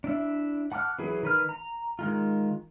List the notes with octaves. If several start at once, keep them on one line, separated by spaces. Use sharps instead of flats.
D4 E4 E5
F#5 A5 D6 F6 F#6
E3 F#3 E4 G#4
D#3 B4 F6
A#5
D#3 G#3 F4